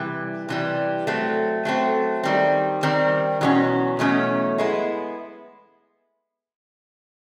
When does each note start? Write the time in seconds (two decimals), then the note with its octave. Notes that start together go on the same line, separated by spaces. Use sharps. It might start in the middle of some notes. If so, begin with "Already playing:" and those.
Already playing: C3 E3 G3
0.49 C3 E3 G3
1.07 F#3 A3 C4
1.65 F#3 A3 C4
2.23 D#3 G3 C4
2.83 D#3 G3 C4
3.41 E2 B2 F#3 A3 C#4
3.99 E2 B2 F#3 A3 C#4
4.58 G#3 B3 E4